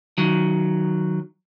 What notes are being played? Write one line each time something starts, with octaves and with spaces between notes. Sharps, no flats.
D#3 F#3